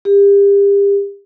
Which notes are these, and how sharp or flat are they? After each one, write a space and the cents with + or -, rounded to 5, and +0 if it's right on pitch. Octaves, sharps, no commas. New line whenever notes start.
G4 +35